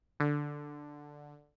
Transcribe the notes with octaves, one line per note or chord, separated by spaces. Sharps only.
D3